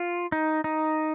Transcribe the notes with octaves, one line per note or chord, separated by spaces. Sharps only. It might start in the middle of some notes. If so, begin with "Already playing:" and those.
Already playing: F4
D#4
D#4